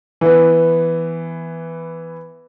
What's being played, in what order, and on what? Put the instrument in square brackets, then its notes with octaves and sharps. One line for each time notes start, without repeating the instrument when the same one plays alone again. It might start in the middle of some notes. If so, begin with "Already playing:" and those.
[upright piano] E3 B3